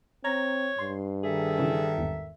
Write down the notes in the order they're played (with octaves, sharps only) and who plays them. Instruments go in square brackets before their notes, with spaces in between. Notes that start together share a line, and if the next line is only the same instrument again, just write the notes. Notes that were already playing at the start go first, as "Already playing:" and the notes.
[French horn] C4 [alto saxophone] C#5 [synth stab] A#5
[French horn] G2 [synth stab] C6
[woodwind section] D#3 A4 E5 [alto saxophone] G#4
[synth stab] C#3 E3
G#1 E2